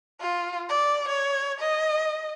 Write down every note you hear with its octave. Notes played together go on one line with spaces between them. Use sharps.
F4
D5
C#5
D#5